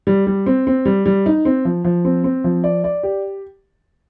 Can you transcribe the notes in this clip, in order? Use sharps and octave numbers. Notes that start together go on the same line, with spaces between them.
G3
G3
C4
C4
G3
G3
D#4
C4
F3
F3
C4
C4
F3
D5
D5
G4